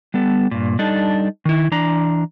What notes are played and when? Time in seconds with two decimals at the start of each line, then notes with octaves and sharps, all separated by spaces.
0.14 G3 B3 A4
0.51 G2 A#2
0.79 G3 D4 D#4 A4
1.45 D#3 E4
1.71 E3 D4 A#5